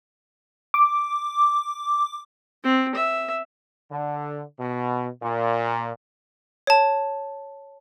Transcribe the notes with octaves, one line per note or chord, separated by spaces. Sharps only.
D6
C4
E5
D3
B2
A#2
C#5 A5